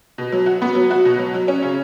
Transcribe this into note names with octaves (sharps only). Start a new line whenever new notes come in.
B2
F#3
F#4
B3
F#3
F#4
B2
F#3
F#3
C#4
C#3